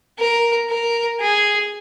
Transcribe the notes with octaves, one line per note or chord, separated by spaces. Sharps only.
A#4
A#4
G#4